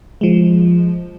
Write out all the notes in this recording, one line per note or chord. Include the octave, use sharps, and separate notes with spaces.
F3 G#3